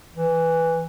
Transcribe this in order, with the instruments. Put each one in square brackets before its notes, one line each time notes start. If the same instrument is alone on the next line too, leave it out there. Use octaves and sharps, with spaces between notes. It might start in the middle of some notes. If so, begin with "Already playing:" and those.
[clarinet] E3